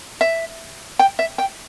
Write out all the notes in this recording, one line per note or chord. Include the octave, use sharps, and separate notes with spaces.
E5
G5
E5
G5